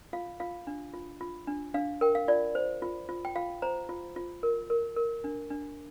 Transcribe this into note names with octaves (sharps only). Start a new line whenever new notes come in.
F4 F5
F4 F5
D4
F4
F4
D4
D4 F5
A#4 G5
F5
F4 D5
C5
F4
F4
G5
F4 F5
C5 A#5
F4
F4
A#4
A#4
A#4
D4
D4